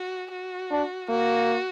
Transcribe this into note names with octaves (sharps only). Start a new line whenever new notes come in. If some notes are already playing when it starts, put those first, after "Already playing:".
Already playing: F#4
F#4
D4
A#3 F#4